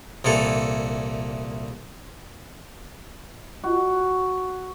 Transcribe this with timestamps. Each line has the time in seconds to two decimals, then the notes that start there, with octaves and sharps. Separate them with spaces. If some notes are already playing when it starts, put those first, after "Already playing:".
0.24 C2 A#2 E3 A4
3.64 F#4